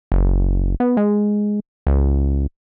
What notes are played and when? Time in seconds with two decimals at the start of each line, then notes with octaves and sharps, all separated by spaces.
0.12 F#1
0.80 B3
0.97 G#3
1.87 C#2